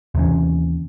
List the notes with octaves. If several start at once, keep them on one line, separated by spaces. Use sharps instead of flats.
D#2 C3 E3 C#4